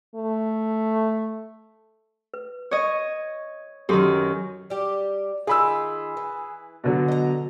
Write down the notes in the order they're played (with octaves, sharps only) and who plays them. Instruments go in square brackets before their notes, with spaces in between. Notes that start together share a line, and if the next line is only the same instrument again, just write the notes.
[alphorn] A3
[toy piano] B4
[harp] C#5 D#5
[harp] F#2 D#3 [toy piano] G4 A4 C6
[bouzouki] G3 G4
[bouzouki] D#3 F4 [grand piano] G#4 B5 E6
[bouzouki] E3
[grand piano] B2 D3 F#3
[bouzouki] D#5 A#5